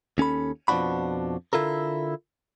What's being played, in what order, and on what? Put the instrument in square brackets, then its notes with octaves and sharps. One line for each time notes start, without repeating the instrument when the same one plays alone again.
[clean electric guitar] D#2 C#4 A4 B5
F2 B2 F3 D4 F#4 B5
D3 E4 F4 A4 A#4